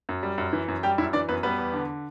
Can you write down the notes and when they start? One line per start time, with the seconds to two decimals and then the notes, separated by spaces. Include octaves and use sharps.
0.09 F#2
0.23 G3
0.38 F#2
0.53 E3
0.68 F#2
0.83 G3 G4 G5
0.98 F#2 E4 E5
1.13 E3 D4 D5
1.29 F#2 B3 B4
1.43 G3 B3 B4
1.59 E2
1.73 D3